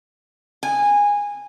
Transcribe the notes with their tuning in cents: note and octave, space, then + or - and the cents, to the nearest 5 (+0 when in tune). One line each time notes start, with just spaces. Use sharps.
G#5 -15